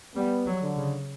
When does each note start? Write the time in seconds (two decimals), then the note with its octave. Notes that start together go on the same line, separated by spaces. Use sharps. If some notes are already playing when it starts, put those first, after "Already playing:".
0.15 G3 B3
0.46 F#3
0.62 D3
0.77 C#3